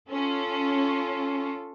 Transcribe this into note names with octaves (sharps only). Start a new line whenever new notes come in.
C#4 F4 A4